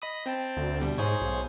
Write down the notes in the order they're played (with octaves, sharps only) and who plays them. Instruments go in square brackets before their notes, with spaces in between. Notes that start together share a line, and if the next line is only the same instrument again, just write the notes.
[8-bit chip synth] D#5 B5 D#6
C4 G5 A5
[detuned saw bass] D2
[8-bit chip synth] B2 G3
[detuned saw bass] G#2 [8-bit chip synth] G#4 C5 C#5
[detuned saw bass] B1